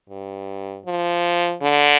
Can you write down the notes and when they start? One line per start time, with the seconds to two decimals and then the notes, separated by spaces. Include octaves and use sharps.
0.09 G2
0.86 F3
1.63 D3